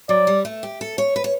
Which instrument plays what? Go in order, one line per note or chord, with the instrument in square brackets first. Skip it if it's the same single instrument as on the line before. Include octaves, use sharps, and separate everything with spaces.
[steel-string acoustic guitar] F#3 [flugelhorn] D5
[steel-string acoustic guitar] G3
A3
G4
A4
C#5
B4
C#5